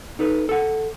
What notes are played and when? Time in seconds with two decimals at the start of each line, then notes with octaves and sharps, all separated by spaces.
0.19 D#4 A4 B4
0.49 A4 F#5